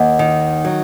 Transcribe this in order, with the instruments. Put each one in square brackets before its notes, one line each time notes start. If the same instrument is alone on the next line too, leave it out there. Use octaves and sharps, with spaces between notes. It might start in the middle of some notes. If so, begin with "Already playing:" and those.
Already playing: [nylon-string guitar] D#2 [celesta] D#5 F#5
[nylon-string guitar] D#3
F#3